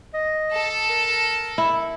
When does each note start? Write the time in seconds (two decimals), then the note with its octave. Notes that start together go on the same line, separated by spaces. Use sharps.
0.14 D#5
0.51 A4 A5
0.89 A#4
1.58 E4